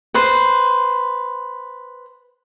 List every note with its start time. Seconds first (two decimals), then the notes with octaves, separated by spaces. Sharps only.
0.14 B4 C5